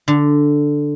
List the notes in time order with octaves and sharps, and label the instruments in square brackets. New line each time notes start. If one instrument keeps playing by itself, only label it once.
[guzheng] D3